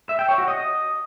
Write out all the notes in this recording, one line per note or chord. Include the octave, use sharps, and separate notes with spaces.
E5
G5
C#5
F#4
D#5